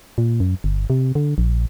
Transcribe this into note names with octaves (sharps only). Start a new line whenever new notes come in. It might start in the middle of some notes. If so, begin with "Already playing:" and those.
A#2
F#2
G1
C3
D3
A#1